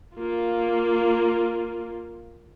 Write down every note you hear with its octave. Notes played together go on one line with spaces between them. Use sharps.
A#3 F4